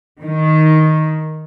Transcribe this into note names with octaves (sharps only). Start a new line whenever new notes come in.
D#3